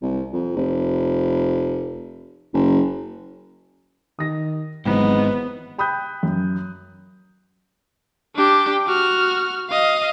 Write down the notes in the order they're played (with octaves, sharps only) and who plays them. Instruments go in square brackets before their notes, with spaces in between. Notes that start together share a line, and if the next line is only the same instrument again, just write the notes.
[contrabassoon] C2
F2
F1
F#1
[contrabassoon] D#3 [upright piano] D#6 A#6
[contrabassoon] G#1 [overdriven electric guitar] G#2 D#4 [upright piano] E3 F#3 C4 [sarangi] B3
[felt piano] G5 B5 D#6 F#6 G6
F#2
[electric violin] D4 G4
F#4 F6
D#5 F5